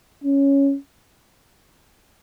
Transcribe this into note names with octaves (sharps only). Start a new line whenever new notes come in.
C#4